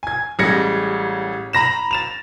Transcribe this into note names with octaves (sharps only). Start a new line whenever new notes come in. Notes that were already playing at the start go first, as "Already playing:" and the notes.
G#5 G#6
A1 G3 G#3 G#6 A#6 C#7
A#5 B5 A#6 E7
A6 E7 F7